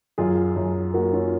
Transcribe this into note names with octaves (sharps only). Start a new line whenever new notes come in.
F#2 F4 G#4
F#2
A#3 F#4 A#4
C#4 F4